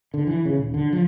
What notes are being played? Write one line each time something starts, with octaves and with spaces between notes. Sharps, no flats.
D3
E3
C#3
D#1
D3
F3